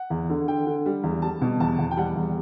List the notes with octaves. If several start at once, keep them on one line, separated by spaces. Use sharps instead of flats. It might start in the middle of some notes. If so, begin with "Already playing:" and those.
Already playing: F#5
E2
D3
D3 G5
D3
G3
E2
G3 A5
B2
E2 A5
E2
G5
G3 F#5
E2